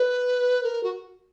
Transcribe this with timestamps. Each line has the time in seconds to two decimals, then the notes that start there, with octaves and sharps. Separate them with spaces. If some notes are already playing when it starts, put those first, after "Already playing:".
Already playing: B4
0.63 A#4
0.83 F#4